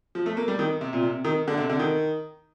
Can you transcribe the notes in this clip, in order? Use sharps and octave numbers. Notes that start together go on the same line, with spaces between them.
F3
A3
A#3
G3
D#3
C3
A#2
C3
D#3
D3
C3
D3
D#3